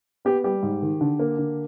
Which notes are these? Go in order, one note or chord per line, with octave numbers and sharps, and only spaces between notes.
B3 G4
G3 G4
G#2
D#3
D3
A#3
D3